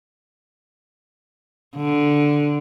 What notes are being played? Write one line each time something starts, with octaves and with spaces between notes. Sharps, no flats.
D3